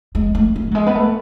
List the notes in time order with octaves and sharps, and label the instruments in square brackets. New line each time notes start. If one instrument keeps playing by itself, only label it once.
[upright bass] G#3
A3
G#3
F#3
G#3
B3
A3